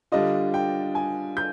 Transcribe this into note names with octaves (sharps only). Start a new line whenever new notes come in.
D3 G3 D4 F4 D#5
G5
G#5
G6